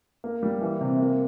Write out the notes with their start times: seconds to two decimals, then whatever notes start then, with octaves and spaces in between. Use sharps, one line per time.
0.24 A#3
0.43 G3
0.61 E3
0.81 C3
1.00 A#3